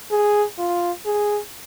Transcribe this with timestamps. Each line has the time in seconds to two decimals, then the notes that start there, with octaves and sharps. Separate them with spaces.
0.11 G#4
0.58 F4
1.06 G#4